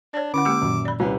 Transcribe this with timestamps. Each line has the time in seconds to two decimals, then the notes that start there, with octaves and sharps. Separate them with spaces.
0.14 D4 C#5 D5
0.34 D3 C#4 E4 F#5 D6
0.45 G#3 A#3 G4 E6
0.62 F#2 A#2 D#3
0.85 D5 B5
1.00 C2 C#4 G4 B4